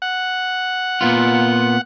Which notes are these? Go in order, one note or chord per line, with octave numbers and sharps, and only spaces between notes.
F#5
A#2 B3 F4